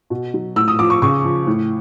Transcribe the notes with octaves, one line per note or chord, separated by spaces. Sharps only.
B2
F#3
A2 E6
D#6
F3 D6
C#6
C#3 C#6
F3
A2